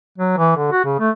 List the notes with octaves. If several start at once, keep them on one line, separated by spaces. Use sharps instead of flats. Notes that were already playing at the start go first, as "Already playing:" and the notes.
F#3
E3
D3
F#4
C#3
A3